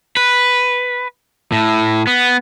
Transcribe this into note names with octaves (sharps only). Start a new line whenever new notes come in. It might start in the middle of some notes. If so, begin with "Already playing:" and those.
B4
A2
B3